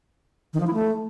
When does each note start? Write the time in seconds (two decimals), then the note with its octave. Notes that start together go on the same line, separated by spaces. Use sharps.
0.54 D#3
0.60 F3
0.67 E4
0.74 A3